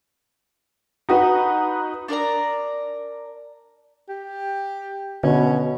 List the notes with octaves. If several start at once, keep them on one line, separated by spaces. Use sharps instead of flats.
D#4 F#4 B4
D4 A#4 D5 A#5
G4
B2 D3 C#4